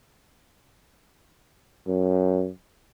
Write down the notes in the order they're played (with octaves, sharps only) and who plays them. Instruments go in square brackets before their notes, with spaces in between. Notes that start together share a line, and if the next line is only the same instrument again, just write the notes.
[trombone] F#2